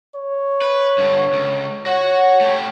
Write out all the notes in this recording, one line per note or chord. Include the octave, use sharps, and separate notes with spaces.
C#5
B4
G2 D3
C#2
F#4 C#5 F#5
A3 G4